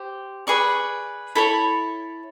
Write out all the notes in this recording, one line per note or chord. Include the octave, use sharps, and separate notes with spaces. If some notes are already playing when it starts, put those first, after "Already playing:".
Already playing: G4 C5
G#4 B4 D5 C#6
E4 A4 C#5 B5